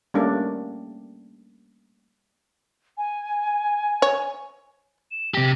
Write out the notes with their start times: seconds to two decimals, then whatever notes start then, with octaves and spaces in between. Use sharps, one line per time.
0.14 G3 A3 A#3 C#4 D4
2.98 G#5
4.02 C#5
5.11 E7
5.34 C3 G4 A#6